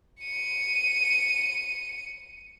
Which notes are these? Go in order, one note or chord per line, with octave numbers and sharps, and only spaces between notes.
C#7 D#7